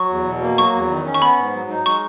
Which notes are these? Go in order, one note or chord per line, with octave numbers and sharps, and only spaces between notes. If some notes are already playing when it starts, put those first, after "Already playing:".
Already playing: F#3 C#6
E2
B2
A#3
F#3 C#6
E2
D#3
C#4
C#6
B3 B5
G#2
F#3
D#4
G#3 C#6